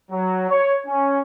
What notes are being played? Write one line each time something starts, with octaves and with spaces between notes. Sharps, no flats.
F#3
C#5
C#4